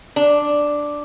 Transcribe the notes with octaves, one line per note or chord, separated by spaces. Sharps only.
D4